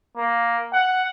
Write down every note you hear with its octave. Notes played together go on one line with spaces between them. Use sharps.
A#3
F#5